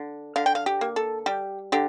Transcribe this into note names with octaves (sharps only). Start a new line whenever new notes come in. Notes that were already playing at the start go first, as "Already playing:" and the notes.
Already playing: D3
D3 F5
G5
F5
G4
A#3
A4
G3 G4
D3 G4